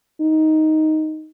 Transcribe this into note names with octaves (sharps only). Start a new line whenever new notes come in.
D#4